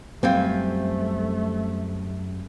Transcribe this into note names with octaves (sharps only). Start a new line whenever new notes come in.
F#2 G3 A3 C4 F4 G5 G#5